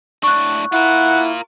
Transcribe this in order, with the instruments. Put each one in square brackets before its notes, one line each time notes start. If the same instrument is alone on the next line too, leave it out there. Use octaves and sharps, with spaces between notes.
[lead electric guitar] A2 D4 [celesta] C#6 F#6
[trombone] E4 [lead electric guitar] F4 A#4 [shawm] F#5